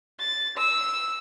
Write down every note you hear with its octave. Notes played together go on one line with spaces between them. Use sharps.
A6
E6